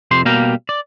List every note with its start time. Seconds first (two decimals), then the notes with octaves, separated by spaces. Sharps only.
0.11 F2 C3 G4 C6
0.25 B2 G3 A#3 F5 G5 A#5
0.69 D5